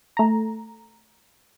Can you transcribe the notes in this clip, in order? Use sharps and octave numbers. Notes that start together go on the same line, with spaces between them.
A3 A#5